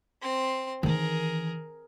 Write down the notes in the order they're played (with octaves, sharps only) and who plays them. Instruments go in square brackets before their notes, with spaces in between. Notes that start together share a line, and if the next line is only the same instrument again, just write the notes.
[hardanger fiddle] C4 C6
[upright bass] D#3 E3 [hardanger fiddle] G#4 A#4